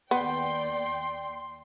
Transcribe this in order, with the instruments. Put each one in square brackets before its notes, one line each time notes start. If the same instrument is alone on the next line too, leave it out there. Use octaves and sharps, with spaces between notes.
[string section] D#2 D5 G5 [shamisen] B3 [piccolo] C6